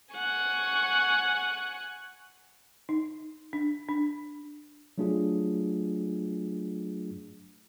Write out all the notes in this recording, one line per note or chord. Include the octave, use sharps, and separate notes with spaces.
F#5 G#5 C#6
D#4
D4
D4
F#3 A3 D4 F4 G#4